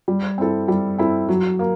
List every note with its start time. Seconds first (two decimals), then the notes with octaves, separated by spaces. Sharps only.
0.08 G3
0.38 C4 E4 A4
0.68 G3
0.98 C4 E4 A4
1.28 F#3
1.59 A#3